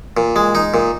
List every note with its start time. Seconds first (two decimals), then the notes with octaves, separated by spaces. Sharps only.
0.17 A#2
0.36 G#3
0.55 D#4
0.74 A#2